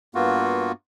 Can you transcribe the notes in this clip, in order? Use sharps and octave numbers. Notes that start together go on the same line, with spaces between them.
G2 A#3 B3 F4 F#4